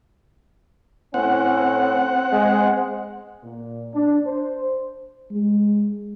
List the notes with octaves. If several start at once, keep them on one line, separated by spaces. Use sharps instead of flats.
A2 C4 C#4 F#5
G#3
A#2
D4
C5
G#3